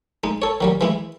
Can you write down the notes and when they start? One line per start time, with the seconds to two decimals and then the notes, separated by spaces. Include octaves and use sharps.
0.24 G#3 D#4
0.42 A4 C#5
0.61 D#3 F#3 G3
0.81 E3 G#3 E4